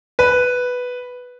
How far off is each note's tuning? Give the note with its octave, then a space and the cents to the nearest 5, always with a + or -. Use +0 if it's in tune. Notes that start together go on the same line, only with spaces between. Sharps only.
B4 +0